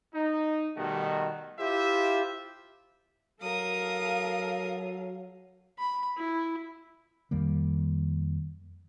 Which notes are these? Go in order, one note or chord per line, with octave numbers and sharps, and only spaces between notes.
D#4
B2 D#3 G3 A3 F#4
E4 F4 G4 C5 E5
F#3 A4 A#4 F5 D#6
B5
E4
F2 D#3 G3 A#3